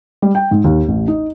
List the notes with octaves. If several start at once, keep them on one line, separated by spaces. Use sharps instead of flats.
G3
G5
G#2
D#2
A1
D#4